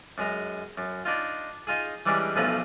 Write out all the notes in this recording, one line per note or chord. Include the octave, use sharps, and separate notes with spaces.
F#2 G#3 A#5
F#2
D4 D#4 F4
D#4 F4 G#4
E3 G3 G#3 C#4 D4
B1 F3 A3 C#4 B4 A#5